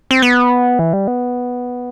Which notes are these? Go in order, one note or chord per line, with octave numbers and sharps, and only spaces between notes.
C4
B3
E3
G3
B3